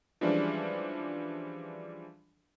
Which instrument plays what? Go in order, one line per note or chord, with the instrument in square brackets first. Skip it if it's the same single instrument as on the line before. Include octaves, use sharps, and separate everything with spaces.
[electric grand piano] E3 F3 G3 G#3 C#4 D4